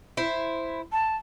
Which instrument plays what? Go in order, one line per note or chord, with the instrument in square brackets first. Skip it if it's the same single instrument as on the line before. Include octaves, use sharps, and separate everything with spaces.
[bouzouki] E4 C5
[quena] A5